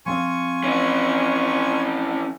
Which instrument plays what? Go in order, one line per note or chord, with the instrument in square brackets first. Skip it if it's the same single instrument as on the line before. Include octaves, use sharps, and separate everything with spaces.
[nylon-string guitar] F3 C4 F5 [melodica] F4 G#5 C#6
[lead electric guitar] E3 C#4